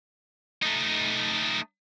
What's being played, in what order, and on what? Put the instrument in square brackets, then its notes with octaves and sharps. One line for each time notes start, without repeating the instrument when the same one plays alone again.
[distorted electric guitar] A3 D#4